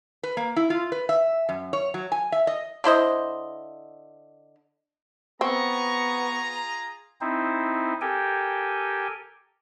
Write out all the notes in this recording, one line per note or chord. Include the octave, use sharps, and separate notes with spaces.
B4
A#3
E4
F4
B4
E5
F#2
C#5
F#3
G#5
E5
D#5
D3 E4 C5 D#5
B3 C4 F4 G#4 A#5 C#6
C4 D#4 E4 C5
G4 A4 A#4 G5 G#5